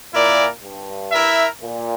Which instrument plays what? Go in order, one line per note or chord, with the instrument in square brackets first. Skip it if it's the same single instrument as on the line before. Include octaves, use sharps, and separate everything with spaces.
[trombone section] A#2 [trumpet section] E4 A#4 D5
[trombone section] G2
[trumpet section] E4 A#4 E5
[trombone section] A#2